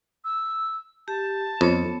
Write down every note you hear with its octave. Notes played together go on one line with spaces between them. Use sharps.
E6
G4 A5
F2 B3 C#5